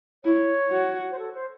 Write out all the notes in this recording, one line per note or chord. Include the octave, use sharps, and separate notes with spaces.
E4 C#5
F#4
C5
A4
C5